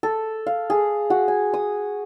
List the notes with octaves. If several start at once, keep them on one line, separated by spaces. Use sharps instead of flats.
A4
F5
G#4
F#4
G#5
D#6